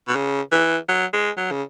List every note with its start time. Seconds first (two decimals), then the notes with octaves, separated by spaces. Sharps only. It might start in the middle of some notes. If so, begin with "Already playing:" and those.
0.08 B2
0.15 C#3
0.52 E3
0.89 F#3
1.13 G#3
1.37 F#3
1.51 C#3